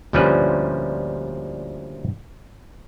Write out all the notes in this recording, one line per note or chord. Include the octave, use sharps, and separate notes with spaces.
D2 A#2 F3 G3 C#4 B4